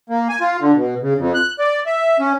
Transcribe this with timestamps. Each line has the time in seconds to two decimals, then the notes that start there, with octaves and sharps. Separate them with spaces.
0.09 A#3
0.29 G#5
0.41 F4
0.60 D3
0.75 B2
1.02 C#3
1.18 F2
1.34 F#6
1.59 D5
1.86 E5
2.20 C#4